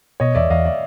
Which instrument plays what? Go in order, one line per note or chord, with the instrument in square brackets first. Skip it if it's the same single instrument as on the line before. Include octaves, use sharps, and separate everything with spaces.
[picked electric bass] B2 [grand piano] C#5 D#5
[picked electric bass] E2 [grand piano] D5 E5
[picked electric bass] E2 [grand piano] D#5 F5
[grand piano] D5 E5